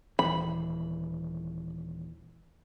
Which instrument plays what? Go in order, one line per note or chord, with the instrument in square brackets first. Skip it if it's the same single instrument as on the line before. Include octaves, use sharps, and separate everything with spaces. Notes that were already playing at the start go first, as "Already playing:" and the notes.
[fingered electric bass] D#1 E3 [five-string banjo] B5